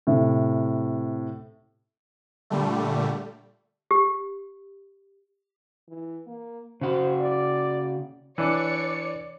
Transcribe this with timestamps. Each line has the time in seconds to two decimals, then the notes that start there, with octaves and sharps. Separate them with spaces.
0.07 A2 C3
2.50 A#2 D3 G3 A3
3.91 G4
5.89 E3
6.27 A#3
6.81 C#3 F#4 C5
7.20 D5
8.38 E3 D4 C#5 D5 C#7